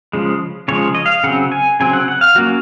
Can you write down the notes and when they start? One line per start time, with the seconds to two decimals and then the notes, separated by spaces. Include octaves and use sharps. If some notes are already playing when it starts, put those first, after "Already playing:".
0.13 C#3 F3 G#3
0.68 C#3 F3 G#3 C#5
0.95 D#5
1.06 F5
1.24 C#3 F#3 C4 F#5
1.52 G#5
1.80 C#3 F#3 C4 G#5
1.93 F#5
2.08 F#5
2.21 F5
2.35 F#3 A#3 C#4 F#4